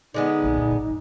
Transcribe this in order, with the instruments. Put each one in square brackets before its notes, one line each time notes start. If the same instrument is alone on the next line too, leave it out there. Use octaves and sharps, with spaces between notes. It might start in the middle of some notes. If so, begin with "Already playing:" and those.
[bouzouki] D3 G#3 B3 [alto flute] D#4
[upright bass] A#1 A#3
F#2 A#2
A1
G2 A#3